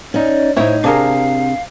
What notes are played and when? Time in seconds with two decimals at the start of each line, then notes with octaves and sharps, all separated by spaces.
0.14 C#4 D#4 D5
0.56 A2 D#4 E4 C5 C#5 E5
0.84 C3 D4 G#4 A#4 F5